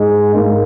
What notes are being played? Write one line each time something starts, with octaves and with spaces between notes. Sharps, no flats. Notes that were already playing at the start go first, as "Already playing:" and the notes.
Already playing: G#2 G#3
G#2 A#3